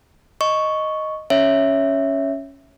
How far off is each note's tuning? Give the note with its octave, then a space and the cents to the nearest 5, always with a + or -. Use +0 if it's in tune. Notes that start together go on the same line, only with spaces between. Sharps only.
D#5 +0 C#6 +0
C#4 +0 C#5 +0 E5 +0